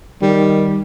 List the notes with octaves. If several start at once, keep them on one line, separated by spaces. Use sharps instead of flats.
D#3 G3